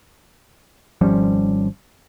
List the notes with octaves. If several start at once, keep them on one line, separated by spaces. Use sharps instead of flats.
G#1 F3 G3 C#4